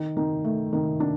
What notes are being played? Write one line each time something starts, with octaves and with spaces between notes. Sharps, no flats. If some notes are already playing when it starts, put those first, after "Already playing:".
Already playing: D#3
D#3
A3
D#3
D4